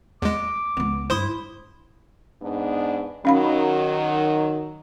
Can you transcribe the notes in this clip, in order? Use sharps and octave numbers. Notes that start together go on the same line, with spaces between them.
E2 G#3 D6
C#2 B3
G2 E4 C5 C6 D#6
G#2 B3 D4
D#3 F#3 C#4 F5 B5